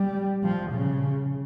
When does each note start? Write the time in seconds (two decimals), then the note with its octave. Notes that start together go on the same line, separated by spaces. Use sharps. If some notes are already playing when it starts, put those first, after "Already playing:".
Already playing: G3
0.43 F3
0.72 C#3